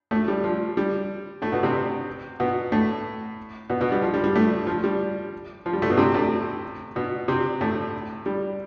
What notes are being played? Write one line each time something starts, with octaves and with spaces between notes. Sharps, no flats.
A2 A3
G3
F3
G3
A2 A3
B2 B3
C3 C4
B2 B3
A2 A3
B2 B3
B2 B3
G3
F3
G3
G3
A2 A3
F3
G3
F3
G3
A2 A3
B2 B3
C3 C4
A2 A3
B2 B3
C3 C4
A2 A3
G3